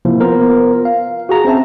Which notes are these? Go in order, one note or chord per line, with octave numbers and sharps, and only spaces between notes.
C3 F3 A#3 E4
B3 F4 A#4 C5
F5
F#4 G#4 A#5
C4 C#4 C5 E5 A5